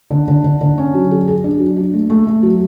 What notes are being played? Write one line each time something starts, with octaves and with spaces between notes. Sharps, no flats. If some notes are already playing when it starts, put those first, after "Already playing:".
D3
D3
D3
D3
C#4
F#3
G#4
G#4
D4
F#3
D4
A3
A3
A3
F#3